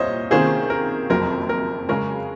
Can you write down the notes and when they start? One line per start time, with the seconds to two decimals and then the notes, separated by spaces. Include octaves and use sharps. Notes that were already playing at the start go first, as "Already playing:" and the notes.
Already playing: C2 A#2 C5 C#5 D#5 F5
0.31 C3 D#3 A#3 C#4 F4 G#4 C5
0.70 A#4
1.10 F#1 F2 C3 F#3 C4 A#4
1.49 A#4
1.89 C#3 G#3 C#4 A#4